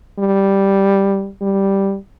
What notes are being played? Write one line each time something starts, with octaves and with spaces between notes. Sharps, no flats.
G3
G3